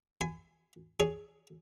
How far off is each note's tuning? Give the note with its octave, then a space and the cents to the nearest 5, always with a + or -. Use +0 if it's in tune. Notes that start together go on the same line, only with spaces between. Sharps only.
G#5 +0 B5 +40
G#4 +0 C#5 +15